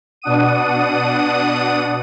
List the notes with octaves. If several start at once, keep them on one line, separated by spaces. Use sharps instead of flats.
B2 D4 F#5 D#6 D#7